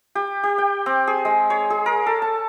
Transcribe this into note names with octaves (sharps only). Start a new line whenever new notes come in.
G4
G4
G5
C4
G#4
G#3
C#5
G#4
A#4
A4
A5